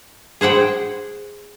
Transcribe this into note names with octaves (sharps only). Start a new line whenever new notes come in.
G#4 C5 F#5 G5